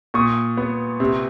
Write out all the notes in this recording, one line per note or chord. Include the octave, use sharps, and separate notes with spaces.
A#2 C#6 D#6
B3
C3